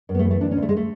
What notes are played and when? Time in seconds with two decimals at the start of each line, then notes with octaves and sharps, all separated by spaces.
0.09 F#2
0.15 B3
0.19 A3
0.24 E3
0.31 A3
0.41 D2 D4
0.51 C#4
0.57 D2
0.62 A3
0.69 G#3
0.77 A3